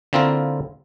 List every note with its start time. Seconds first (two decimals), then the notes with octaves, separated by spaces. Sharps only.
0.13 D3 A#3 C4 E4 F4 A#4